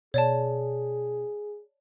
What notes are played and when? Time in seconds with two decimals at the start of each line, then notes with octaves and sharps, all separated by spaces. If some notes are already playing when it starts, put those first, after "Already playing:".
0.14 B2 G#4 C#5 D5 A5